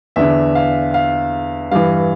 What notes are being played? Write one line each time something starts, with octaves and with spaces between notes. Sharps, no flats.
E2 D3 E5
F5
F5
G2 E3 F5